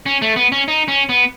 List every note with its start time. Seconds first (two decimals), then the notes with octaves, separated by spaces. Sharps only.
0.06 C#4
0.22 A3
0.36 B3
0.52 C#4
0.68 D#4
0.88 C#4
1.09 B3